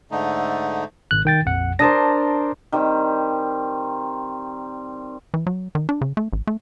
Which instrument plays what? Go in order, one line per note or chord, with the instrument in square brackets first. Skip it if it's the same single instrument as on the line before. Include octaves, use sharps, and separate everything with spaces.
[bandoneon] G#2 D3 A3 D#4
[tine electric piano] G#1 F#6
D#3 G5 A6
A#1 F2 F#5
[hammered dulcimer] D4 A#4 C5 [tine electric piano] A5 D#6 A#6
[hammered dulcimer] D#3 G3 C4
[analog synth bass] E3
F#3
D#3
D4
C#3
A3
A1
A3